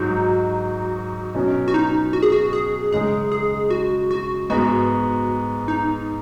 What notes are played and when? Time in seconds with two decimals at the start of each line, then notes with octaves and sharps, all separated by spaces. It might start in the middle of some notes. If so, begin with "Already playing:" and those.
Already playing: G#2 F#3 D#4 F#4
1.35 B2 F#3 C#4
1.68 F#4
1.74 D#4
2.13 F#4
2.22 G#4
2.32 F#4
2.53 G#4
2.92 F#2 C#3 G#3 D#4 G#4
3.32 G#4
3.70 F#4
4.11 F#4
4.50 G#2 G#3 B3 F#4
5.68 D#4